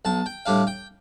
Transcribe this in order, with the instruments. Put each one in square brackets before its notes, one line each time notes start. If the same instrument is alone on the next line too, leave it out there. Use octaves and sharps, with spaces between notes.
[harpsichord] B1 A5
G5
A2 G3 D4 F5
G5